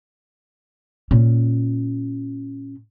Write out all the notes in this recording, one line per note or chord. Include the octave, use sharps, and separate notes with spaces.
A#2 C#4